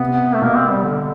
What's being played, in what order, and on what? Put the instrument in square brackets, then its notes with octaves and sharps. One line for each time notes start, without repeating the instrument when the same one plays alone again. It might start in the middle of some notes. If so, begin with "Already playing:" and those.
Already playing: [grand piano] C3 [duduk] B3
[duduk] A3
[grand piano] B2 [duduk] A#3
[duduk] C4
G3
D3